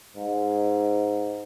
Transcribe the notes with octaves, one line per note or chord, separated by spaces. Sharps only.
G#2